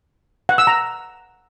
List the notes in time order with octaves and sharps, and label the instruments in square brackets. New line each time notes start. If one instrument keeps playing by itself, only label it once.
[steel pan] F#5
E6
A#5